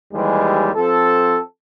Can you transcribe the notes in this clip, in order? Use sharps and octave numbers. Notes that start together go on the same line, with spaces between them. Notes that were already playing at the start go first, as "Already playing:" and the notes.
D#2 E3 G3 G#3
F3 C4 A4